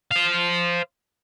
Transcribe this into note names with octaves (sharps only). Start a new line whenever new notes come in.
C5 F5